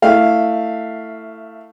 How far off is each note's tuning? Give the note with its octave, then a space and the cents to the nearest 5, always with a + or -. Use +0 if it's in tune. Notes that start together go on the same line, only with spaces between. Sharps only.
A3 +15 E4 +0 F5 +0